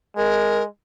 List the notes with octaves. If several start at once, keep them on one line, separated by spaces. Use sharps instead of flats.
G#3 A#4